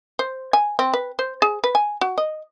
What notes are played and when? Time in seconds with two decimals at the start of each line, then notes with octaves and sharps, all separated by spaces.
0.19 C5
0.53 G#5
0.79 C4
0.94 B4
1.19 C5
1.42 G#4
1.64 B4
1.75 G#5
2.01 F#4
2.18 D#5